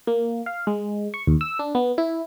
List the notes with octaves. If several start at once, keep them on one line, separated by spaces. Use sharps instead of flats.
A#3
F5
G#3
C#6
D#2
E6
D4
B3
E4